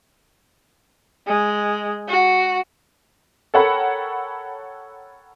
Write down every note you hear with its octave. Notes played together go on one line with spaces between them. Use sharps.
G#3
F#4
A4 A#4 C#5 F#5 G5 B5